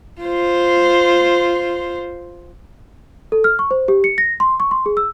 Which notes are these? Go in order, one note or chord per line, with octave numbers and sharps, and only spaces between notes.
F4 C5
A4
F6
C#6
C5
G4
C#7
A#6
C6
C#6
C6
G#4
E6